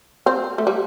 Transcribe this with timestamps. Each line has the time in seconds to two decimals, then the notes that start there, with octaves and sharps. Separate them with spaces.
0.26 C4
0.58 A3
0.67 G3